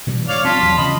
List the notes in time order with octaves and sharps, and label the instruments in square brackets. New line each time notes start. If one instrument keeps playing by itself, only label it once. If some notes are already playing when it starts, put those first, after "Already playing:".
[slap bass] B2 E3 G3
[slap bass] G2 [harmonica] C#5 D5 F5 [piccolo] F7
[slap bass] C4 [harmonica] F4 A5 [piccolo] B6
[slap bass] E2 F#3 G3
[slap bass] C#3 E3 F3 [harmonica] D#5 B5